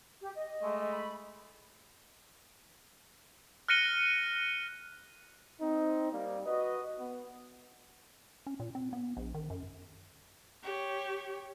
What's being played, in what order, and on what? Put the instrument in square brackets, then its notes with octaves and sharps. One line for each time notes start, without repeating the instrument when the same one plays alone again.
[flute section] G4
D#5
[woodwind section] G#3 A3
[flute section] B5
[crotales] F6 F#6 A#6 C#7 D#7 G7
[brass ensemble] C4 D#4
G3 A#3
F#4 B4 D#5
B3
[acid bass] C#4
A#2
C4
B3
A#1
D#3
F#2
[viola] G4 C#5